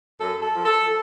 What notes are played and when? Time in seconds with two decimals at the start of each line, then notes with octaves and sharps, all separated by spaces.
0.19 F#2 A4
0.42 A4
0.54 F3
0.65 A4